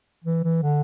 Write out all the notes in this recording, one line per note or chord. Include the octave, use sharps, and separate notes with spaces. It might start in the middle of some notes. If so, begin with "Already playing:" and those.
E3
E3
D3